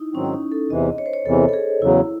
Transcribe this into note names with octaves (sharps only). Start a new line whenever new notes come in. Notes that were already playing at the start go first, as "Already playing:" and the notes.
Already playing: D#4 E4
G#2 D#3 F#3 C4 C#4
C#4
D#4
A4
E2 C3 E3 D#5
C#5
C5
C#5
E2 C3 E3 A4
A4
G#4
E2 C#3 F#3 E4